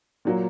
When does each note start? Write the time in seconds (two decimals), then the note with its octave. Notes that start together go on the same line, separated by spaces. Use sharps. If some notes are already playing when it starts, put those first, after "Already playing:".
0.25 A#2 F#3 A#3